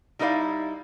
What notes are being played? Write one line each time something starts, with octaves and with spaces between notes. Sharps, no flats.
G3 D#4 E4 B4 D5 F5